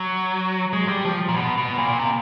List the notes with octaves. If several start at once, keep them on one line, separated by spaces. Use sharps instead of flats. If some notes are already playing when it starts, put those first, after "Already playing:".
Already playing: F#3
G#3
G3
F3
A#2
B2
B2
A#2
C3